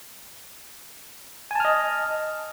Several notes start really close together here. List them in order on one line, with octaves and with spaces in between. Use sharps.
G#5 A5 F6 D#5